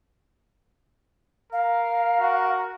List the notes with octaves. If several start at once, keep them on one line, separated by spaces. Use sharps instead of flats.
A#4 F5
F#4